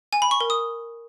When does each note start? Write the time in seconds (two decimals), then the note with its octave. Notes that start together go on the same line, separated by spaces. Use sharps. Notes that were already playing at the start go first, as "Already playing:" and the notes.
0.13 G#5
0.22 B5
0.31 C#6
0.41 A#4
0.50 D#6